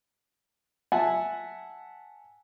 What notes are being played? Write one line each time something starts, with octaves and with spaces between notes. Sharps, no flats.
E5 F#5 G#5 A5